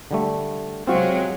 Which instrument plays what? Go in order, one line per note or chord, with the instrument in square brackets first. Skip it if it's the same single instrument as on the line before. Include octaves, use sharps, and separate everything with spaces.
[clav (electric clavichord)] D3 G3 A3
[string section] C3 F#3 G#3 [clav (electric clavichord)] C4 F4 F#4